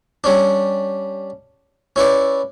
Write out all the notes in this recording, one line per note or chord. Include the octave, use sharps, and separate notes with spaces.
G3 C#4 D4
C#4 E4 B4 D5